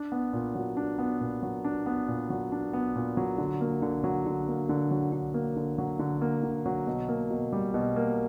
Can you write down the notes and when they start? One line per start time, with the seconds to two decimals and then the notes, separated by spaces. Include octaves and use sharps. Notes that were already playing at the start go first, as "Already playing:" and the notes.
Already playing: D4
0.12 B3
0.33 A#2
0.55 F#3
0.77 D4
0.99 B3
1.21 A#2
1.43 F#3
1.65 D4
1.86 B3
2.08 A#2
2.30 F#3
2.52 D4
2.73 B3
2.95 A#2
3.17 F#3
3.38 D3
3.61 A#3
3.82 D3
4.04 F#3
4.26 D3
4.48 A#3
4.69 D3
4.91 F#3
5.12 D3
5.34 A#3
5.56 D3
5.78 F#3
5.99 D3
6.22 A#3
6.43 D3
6.66 F#3
6.87 B2
7.09 A#3
7.30 B2
7.53 G3
7.74 B2
7.96 A#3